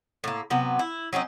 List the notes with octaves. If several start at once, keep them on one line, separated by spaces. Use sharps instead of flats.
A2 A#3
C3 F#3 B3
E4
F#3 C4 C#4 D#4